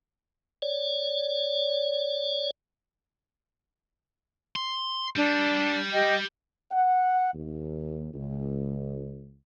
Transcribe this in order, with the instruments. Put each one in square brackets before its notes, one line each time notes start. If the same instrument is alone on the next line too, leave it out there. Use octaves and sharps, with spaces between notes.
[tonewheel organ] C#5 D5
[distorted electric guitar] C6
[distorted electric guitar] G3 [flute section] D4
[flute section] G4 D#5 G5
[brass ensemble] F#5
D#2
C#2